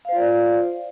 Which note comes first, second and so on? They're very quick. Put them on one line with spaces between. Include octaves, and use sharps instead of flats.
F5 C5 F4 D5